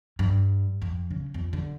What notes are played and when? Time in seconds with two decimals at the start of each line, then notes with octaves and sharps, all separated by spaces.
0.19 G2
0.82 F2
1.11 C#3
1.34 F2
1.53 D3